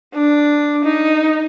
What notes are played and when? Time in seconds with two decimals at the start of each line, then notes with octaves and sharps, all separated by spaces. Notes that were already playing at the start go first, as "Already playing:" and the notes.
0.15 D4
0.85 D#4